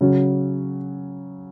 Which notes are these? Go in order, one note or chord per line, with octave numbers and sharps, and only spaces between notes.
C#3 F#3 C#4